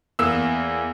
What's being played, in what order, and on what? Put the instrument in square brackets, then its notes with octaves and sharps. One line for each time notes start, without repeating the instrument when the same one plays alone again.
[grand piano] E2 A#3 E6